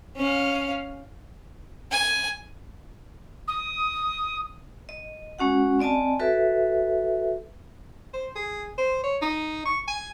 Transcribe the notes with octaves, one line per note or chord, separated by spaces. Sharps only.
C#4 F5
G#5
D#6
D#5
G#3 C#4 F#4 F#5
C4 D5 D#5 G#5 A5
F#4 A4 B4 E5
C5
G#4
C5
C#5
D#4
C#6
G#5